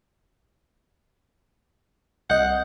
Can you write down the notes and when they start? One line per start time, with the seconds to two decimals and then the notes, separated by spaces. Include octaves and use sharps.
2.30 C2 D#5 F#5 G6